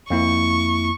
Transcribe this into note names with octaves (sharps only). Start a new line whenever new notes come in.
F2 A#3 E4 C#6